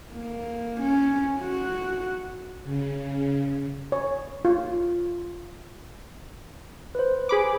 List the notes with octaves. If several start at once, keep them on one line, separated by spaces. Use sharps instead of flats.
A#3
C#4
F#4
C#3
C#5
F4
B4 C5
G#4 B5 D6